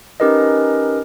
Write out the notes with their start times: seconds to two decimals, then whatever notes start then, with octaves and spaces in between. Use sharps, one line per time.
0.20 C#4 D#4 G4 A#4 B4 D#5